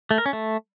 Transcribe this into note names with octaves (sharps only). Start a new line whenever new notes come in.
A3
A#4
C#4
A3